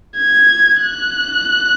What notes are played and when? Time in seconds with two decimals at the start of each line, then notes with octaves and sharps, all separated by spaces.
0.18 G#6
0.82 F#6